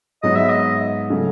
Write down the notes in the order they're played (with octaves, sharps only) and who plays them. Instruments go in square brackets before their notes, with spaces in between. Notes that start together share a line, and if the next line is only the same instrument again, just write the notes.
[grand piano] G#2 F#3 B3 [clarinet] D#5
[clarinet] E5
D#5
[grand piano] C#3 F#3 A3